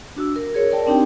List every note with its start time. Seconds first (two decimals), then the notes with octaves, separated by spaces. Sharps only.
0.16 D4 F#4 E6
0.36 A#4
0.54 G#4 A#4 C#5
0.71 A#4 D5 G5 A5
0.87 C4 D4 D#4 G4 G5